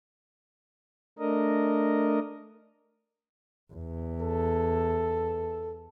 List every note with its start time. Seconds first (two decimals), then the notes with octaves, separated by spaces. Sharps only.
1.19 A3 D4 A#4 D#5
3.73 E2
4.21 A4